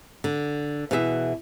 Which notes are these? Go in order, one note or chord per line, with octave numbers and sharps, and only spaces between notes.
D3
B2 E3 G#4 D5 E5